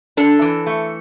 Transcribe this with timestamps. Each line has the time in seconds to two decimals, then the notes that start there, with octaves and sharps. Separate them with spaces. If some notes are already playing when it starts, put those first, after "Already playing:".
0.17 D4 A4
0.42 E3
0.67 A3